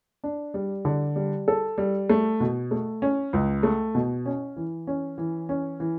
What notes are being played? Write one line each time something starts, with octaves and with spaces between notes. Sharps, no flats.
D4
G3
D3
G3
A4
G3
A3
B2
A3
C#4
C#2
A3
B2
C#4
E3
C#4
E3
C#4
E3